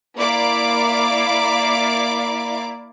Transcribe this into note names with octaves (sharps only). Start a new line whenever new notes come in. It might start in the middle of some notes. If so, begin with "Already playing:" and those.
A#3 E4 D5 F5 D6